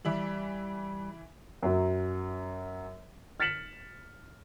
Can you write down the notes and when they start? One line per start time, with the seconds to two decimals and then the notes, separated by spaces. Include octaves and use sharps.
0.05 E3 G3 E5 F#7
1.62 F#2 F#3
3.40 F6 A6 B6 C#7 E7 F#7